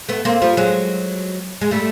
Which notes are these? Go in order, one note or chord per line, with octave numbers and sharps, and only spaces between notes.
A3 B3
A#3 C4
F3 G3
F#3 G#3
G#3
G3 A3